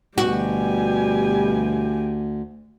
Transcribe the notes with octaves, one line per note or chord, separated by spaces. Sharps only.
D2 B2 G3 F#4 G4 G#5